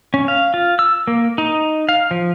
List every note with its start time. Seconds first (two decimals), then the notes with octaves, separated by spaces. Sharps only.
0.14 C#4
0.28 F5
0.54 F4
0.79 E6
1.07 A#3
1.38 D#4
1.89 F5
2.11 F3